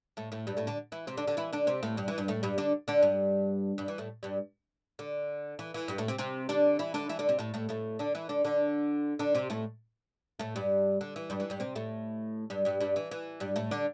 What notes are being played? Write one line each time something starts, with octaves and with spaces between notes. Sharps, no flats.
A2 A3
A2 A3
G2 G3
A2 A3
D3 D4
E3 E4
C3 C4
D3 D4
D3 D4
E3 E4
D3 D4
C3 C4
A2 A3
G2 G3
E3
G2 G3
A2 A3
G2 G3
D3 D4
D3 D4
G2 G3
G2 G3
E3
A2 A3
G2 G3
D3
E3
E3
G2 G3
A2 A3
C3 C4
C3 C4
D3 D4
E3 E4
D3 D4
E3 E4
D3 D4
C3 C4
A2 A3
A2 A3
A2 A3
D3 D4
E3 E4
D3 D4
D3 D4
D3 D4
C3 C4
A2 A3
A2 A3
G2 G3
D3
E3
G2 G3
E3
G2 G3
C3 C4
A2 A3
G2 G3
G2 G3
G2 G3
E3
E3
G2 G3
A2 A3
D3 D4